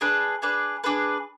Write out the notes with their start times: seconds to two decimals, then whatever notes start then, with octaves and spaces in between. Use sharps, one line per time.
0.01 D4 G#4 B4
0.42 D4 G#4 B4
0.84 D4 G#4 B4